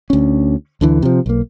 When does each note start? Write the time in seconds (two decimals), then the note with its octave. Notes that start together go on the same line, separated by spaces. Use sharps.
0.10 D2 C#4
0.81 D2 D3 E3
1.02 C3 F3
1.26 B1 A#3